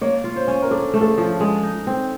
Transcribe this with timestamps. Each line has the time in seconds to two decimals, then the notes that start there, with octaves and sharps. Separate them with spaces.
0.01 A#3 C#5
0.24 F4
0.36 C5
0.48 C#4
0.62 A#4
0.71 D4 A4
0.94 A3
1.01 A4
1.06 G#4
1.18 F3
1.40 G#3 A4
1.63 D#4
1.87 C4